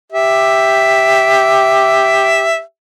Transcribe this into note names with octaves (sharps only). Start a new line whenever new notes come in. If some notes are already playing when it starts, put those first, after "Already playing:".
G4 E5